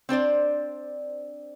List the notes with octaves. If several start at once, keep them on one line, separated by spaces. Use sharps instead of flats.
C4 D4 C5 D5